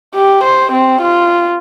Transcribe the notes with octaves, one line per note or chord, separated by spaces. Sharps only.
G4
C5
C4
F4